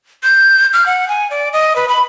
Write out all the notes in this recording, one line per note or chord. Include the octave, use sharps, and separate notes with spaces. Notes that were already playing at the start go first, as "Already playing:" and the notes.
G6
F6
F#5
G#5
D5
D#5
B4
B5